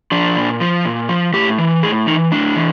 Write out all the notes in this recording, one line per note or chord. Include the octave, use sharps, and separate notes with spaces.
F3 D4
A#2
F3
A#2
F3
A2 G4
E3
A2 G#4
E3 D#4
A2 D4
E3